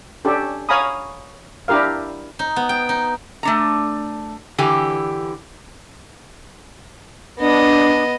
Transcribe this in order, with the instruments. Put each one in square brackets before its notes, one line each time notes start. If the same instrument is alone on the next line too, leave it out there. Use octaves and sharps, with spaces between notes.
[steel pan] C#4 D4 G4 A4
C#5 F5 G#5 A#5 B5 D#6
D4 E4 G4 A#4 F5
[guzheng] D#4
B3
G5
D#4
[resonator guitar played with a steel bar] A3 D4 A#5
D3 E3 G4 G#5
[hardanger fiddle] B3 D#5 [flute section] D4